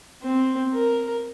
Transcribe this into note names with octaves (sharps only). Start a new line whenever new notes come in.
C4
A#4